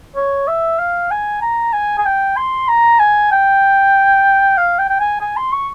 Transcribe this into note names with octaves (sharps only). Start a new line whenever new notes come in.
C#5
E5
F5
G#5
A#5
G#5
G#5
G5
C6
A#5
G#5
G5
F5
G5
G5
G#5
G#5
C6
C#6